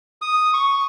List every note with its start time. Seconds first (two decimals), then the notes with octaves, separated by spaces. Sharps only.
0.22 D#6
0.54 C#6